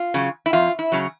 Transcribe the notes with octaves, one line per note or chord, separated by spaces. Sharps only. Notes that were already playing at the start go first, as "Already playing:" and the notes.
Already playing: F4
C#3 F#3
E4
F2 F4
E4
C#3 F#3